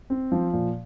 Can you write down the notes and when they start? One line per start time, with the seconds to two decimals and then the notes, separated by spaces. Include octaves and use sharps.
0.10 C4
0.32 F3
0.53 A#2